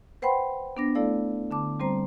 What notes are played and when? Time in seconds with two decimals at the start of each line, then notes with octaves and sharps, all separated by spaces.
0.22 B4 C5 F#5 G5 B5 C6
0.77 B3 D4 A#6
0.95 A3 E4 A4 D5 F5
1.51 D3 A5 D6
1.80 G3 C4 C5 A#5